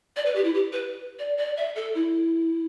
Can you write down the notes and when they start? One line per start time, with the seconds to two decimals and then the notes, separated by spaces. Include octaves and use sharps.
0.16 D5
0.26 B4
0.35 G4
0.44 E4
0.54 G4
0.72 B4
1.19 D5
1.38 D5
1.57 E5
1.76 A4
1.95 E4